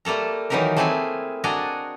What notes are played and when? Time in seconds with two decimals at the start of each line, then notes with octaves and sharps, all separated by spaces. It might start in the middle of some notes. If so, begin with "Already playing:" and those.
0.05 G3 A3 A#3 A4 A#5
0.50 D#3 E3 F#3 D#4 G4 A#4
0.77 A3 A#3 C4 E4 G#4 G#5
1.44 D4 F#4 D5 D#5 G#5 A#5